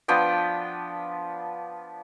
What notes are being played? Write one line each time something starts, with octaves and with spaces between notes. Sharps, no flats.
F3 B3 D4 G5